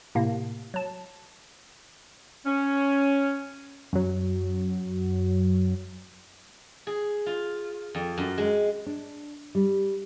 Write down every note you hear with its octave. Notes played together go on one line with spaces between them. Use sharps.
A2 C3 A#3
F#3 A5
C#4
F#2 F#3
G#4
F4
F2
F#2
G#3
D4
G3